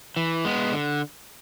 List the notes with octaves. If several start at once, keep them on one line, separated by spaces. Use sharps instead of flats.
E3
G#3 B3
D3